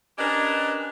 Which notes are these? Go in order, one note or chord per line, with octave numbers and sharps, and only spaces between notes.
C#4 D4 G4 A#4 B4 D#5